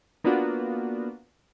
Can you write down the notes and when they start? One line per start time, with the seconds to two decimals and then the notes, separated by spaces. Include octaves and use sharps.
0.24 A#3 B3 D4 F4 F#4